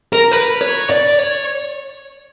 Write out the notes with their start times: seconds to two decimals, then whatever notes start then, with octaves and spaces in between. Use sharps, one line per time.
0.13 A#4
0.32 B4
0.61 C#5
0.90 D5
1.19 C#5